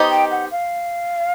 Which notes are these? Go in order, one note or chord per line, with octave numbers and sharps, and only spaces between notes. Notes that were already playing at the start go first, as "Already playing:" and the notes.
Already playing: B3 D#4 G4 C5 D#5
G5
F#5
F5